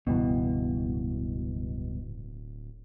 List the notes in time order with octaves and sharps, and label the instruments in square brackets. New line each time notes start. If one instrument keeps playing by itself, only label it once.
[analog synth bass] D1 [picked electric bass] C#2 G2 E3 [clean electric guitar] B2